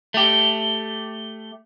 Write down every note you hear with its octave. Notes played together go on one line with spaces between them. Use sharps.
A3 G4